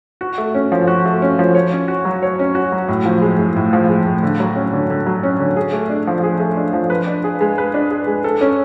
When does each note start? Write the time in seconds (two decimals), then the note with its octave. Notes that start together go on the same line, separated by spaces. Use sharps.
0.21 F#4
0.38 A3
0.54 C#4
0.72 F3
0.87 F#4
1.05 A3
1.22 C#4
1.39 F3
1.55 C#5
1.72 C#4
1.88 F#4
2.05 F#3
2.23 C#5
2.39 C#4
2.55 F#4
2.72 F#3
2.88 A2
3.05 F3
3.22 G#3
3.39 A2
3.56 A2
3.73 F3
3.89 G#3
4.06 A2
4.23 D3
4.40 F#3
4.56 C#4
4.73 D3
4.90 D3
5.07 F#3
5.23 C#4
5.40 D3
5.57 G#4
5.73 A3
5.89 D4
6.07 F3
6.23 G#4
6.40 A3
6.57 D4
6.73 F3
6.90 B4
7.07 D4
7.24 G#4
7.41 G#3
7.58 B4
7.74 D4
7.91 G#4
8.07 G#3
8.24 A4
8.41 C#4